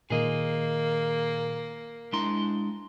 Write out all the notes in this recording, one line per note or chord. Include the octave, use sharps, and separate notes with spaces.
A#2 D#3 A#3 G#4 D#5
G#3 D4 E4 A#5 C6